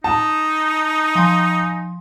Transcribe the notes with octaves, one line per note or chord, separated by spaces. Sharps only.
D#4 A5
F3 G#5